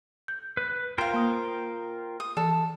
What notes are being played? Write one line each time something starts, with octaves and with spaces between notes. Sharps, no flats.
G6
B4
F4 A#4 C5 F5 G5
A#3 D#6
D#6
E3 A4